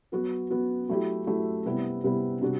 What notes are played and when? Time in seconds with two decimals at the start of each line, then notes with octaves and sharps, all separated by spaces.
0.12 F#3 B3 F#4
0.50 F#3 B3 F#4
0.89 F#3 A3 E4 G4
1.27 F#3 A3 E4 G4
1.65 C3 G3 B3 E4
2.04 C3 G3 B3 E4
2.41 C3 G3 D4 F#4